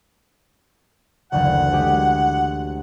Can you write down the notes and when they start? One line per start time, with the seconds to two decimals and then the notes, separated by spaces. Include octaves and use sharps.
1.32 F#1 D2 E3 F#5
1.72 G#3 G4 G#4